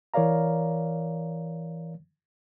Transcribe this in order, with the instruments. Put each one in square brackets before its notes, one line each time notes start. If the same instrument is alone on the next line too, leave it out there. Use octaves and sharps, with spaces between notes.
[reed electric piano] E3 A#4 C#5 D5 F5 A#5